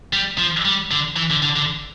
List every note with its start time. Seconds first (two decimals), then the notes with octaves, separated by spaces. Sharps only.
0.13 G3
0.38 F3
0.65 G3
0.91 D3
1.16 E3
1.30 D3
1.43 D3
1.56 D3